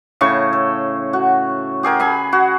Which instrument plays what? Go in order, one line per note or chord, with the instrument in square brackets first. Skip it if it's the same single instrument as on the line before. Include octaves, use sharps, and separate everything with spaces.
[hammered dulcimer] A2 C#3 C#6
A4
F#4
G4 G#4 A#4 G5
G#4 G#5 B5
F#4